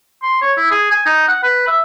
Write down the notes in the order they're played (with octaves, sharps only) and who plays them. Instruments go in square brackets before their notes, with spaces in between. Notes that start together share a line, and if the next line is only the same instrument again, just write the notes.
[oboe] C6
C#5
E4
G#4
G#5
D#4
F#5
B4
E5